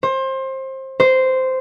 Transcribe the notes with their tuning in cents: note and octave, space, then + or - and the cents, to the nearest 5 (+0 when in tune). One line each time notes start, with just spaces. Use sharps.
C5 +25
C5 -10